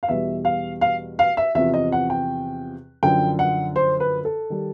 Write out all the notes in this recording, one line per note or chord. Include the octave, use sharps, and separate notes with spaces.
F5
E2 B2 G3 E5
F5
F5
F5
E5
E2 C3 F3 E5
D#5
F#5
G5
F#2 D3 F3 G5
F#5
C5
B4
A4
D#3 G3